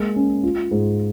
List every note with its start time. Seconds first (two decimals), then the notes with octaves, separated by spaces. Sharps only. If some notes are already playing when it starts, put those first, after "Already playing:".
Already playing: G#3 A#3
0.16 C#4
0.43 F4
0.71 G#2